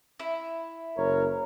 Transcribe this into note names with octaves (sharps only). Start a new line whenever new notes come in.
E4
F#1 A#4 C#5